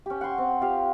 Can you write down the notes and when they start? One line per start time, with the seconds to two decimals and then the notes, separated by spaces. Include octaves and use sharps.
0.06 C#4 G4
0.21 F#5 G5 C6 C#6
0.38 C4
0.61 F4 G4 F5